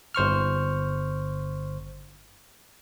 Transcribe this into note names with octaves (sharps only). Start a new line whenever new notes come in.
G1 C5 C#6 F6